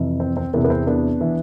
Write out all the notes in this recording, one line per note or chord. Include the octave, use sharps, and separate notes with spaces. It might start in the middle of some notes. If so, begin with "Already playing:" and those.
Already playing: F2 C3 E3
C4
C4
E2 C3 E3 B3
B3
C4
B3 D4
E3